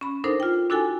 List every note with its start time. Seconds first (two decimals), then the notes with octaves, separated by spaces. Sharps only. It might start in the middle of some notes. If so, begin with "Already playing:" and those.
0.01 C#4 B5
0.24 D4 D#4 A4 A#4 C5
0.40 F4 G5
0.70 D4 E4 F#4 A4 G5 G#5